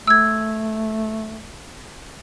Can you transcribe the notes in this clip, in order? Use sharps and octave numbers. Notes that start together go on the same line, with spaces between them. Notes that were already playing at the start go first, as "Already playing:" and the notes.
A3 E6 G#6